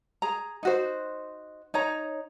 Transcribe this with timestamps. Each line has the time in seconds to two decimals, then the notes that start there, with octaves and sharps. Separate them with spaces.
0.22 G#4 A#5
0.63 D#4 F#4 C5
1.74 D#4 C#5 A#5